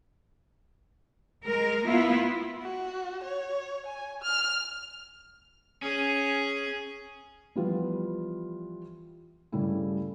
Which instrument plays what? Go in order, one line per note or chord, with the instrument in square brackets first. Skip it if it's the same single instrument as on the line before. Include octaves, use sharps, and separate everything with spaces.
[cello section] G#3 A#4
B3 E4 F4
[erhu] F#4
C#5
G#5
F6
[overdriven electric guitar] C#4 [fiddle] G#4
[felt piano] E3 F3 G3 B3 E4 F4
G2 C#3 G3 A3 E4